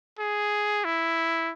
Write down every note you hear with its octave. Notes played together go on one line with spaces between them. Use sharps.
G#4
E4